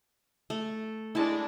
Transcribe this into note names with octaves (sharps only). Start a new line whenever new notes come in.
A3
G#3 D4 E4 A5